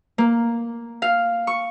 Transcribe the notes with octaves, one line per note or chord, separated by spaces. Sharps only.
A#3
F5
C#6